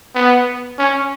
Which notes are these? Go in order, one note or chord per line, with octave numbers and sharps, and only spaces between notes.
B3
C#4